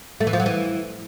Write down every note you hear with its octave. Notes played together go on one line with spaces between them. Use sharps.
A3
E3
F3
F#3
E3